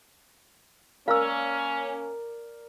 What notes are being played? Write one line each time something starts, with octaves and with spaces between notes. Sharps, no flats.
A#3 C#4 A#4 D5 F5 E6